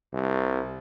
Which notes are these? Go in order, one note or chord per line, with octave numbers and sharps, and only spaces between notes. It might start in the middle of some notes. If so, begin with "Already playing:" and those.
C2